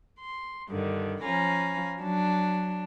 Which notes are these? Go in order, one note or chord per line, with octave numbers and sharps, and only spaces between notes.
C6
G2 D3 D#3
F3 C#4 F5 G#5 A#5 B5
F#3 D4